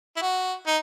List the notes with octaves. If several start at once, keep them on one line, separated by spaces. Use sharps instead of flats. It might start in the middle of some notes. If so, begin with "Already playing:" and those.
E4
F#4
D#4